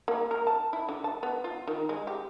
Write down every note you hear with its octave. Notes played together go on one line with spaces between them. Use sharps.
A#3
A#4
A5
E4
D3
A5
B3
F4
D#3
G#3
G4